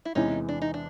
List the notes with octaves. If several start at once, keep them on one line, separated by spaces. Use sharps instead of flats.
E4
E2 C3 E3 G#3 C#4 D#4
D4
D#4
D4